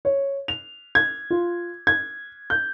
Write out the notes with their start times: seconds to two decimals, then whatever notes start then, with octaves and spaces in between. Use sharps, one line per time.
0.05 C#5
0.48 F7
0.95 G#6
1.30 F4
1.87 G#6
2.50 G6